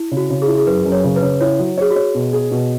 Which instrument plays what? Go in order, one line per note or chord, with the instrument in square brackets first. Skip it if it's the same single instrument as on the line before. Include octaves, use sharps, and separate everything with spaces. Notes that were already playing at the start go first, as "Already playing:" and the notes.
Already playing: [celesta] E4
[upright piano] C#3
[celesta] F#4
[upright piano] C#3
[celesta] G#4
[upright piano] E4
[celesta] G#4
[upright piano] F#2 [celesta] B4
[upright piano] F#2
[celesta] C#5
[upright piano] C#3
[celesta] B4
[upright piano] C#3
[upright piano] E4 [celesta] C#5
[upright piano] F#3
[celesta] G#4 [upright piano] C#5
[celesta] F#4
[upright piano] C#5
B2
G#4
B2